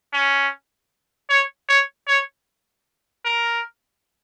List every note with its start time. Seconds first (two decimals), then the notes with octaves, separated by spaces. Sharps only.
0.13 C#4
1.30 C#5
1.69 C#5
2.08 C#5
3.25 A#4